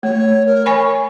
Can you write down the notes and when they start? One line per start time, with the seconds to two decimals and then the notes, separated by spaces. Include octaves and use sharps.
0.03 A3 C#5
0.46 A#4
0.66 C#5 G#5 B5 C#6